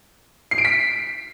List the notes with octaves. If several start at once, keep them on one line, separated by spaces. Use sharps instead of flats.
C7
D7
B6